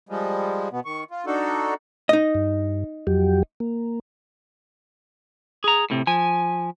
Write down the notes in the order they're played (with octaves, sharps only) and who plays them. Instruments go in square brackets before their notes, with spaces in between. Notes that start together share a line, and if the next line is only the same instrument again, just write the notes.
[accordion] F3 G3 G#3
B2 B3
D#3 C#6
F4
D4 D#4 F#4 A4
[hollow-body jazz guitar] D#4 D#5
[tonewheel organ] G2
F2 F#3 G4
A#3
[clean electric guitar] G#4 A#5
A2 C3
[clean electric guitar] F3 [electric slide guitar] G#5